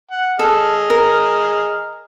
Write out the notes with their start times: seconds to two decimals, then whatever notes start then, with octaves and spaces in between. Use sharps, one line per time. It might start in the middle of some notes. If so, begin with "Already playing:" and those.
0.11 F#5
0.39 G#4 A4 D#5 F6
0.90 A#4